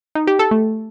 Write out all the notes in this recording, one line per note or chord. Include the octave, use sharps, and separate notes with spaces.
D#4
G4
A4
A3